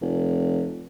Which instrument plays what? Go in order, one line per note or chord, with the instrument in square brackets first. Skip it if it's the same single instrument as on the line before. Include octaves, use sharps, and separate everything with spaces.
[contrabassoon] F1